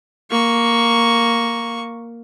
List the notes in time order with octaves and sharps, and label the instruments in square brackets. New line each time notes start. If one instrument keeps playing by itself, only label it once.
[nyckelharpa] A#3 C#6